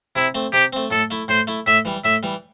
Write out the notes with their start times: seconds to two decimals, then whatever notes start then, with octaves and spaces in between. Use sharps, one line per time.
0.16 C3 E4
0.35 A3 C4
0.53 C3 G4
0.73 A3 C4
0.91 A2 A4
1.11 A3 E4
1.28 A2 C5
1.47 A3 E4
1.67 A2 E5
1.85 E3 G3
2.04 A2 E5
2.23 E3 G3